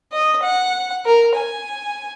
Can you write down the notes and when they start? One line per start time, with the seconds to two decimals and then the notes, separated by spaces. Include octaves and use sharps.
0.12 D#5
0.42 F#5
1.06 A#4
1.35 G#5